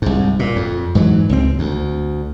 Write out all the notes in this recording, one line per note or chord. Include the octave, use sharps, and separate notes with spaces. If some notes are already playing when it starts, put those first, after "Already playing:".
C2 G#2
A#2
F2
G#2 E3 F#3
C#2 C4
D2